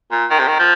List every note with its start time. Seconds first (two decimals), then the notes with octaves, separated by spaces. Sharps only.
0.11 A#2
0.30 D#3
0.39 C3
0.47 D#3
0.59 F3